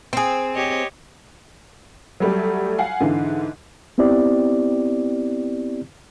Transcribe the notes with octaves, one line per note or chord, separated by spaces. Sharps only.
C4 G#4
G4 C#5 D#5
F#3 G3 A3 G4
F5 F#5 G#5 C7
G#2 D3 E3
B3 C4 E4 G4 D5